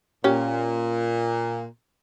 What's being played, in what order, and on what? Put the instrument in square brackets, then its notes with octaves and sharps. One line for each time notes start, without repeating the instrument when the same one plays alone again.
[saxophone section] A#2 [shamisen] C#4 G4